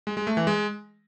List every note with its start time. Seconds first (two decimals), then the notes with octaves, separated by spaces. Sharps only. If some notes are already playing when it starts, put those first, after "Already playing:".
0.07 G#3
0.17 G#3
0.27 A3
0.37 E3
0.47 G#3